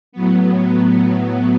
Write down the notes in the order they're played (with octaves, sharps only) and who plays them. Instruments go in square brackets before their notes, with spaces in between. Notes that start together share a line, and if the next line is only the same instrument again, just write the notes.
[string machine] A2 F#3 B3